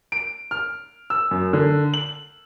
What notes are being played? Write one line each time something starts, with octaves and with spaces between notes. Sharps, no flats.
D7
F6
E6
F#2
D3
F#7